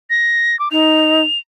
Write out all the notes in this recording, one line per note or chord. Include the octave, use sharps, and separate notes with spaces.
A#6
D6
D#4 F7